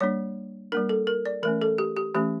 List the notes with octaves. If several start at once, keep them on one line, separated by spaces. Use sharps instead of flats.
G3 A#3 D4 C#5
G3 A#3 D4 A#4
A4
A#4
D5
E3 A3 C#4 A#4
A4
G4
G4
E3 A3 C#4 G4